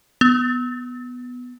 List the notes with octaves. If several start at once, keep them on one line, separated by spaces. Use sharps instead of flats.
B3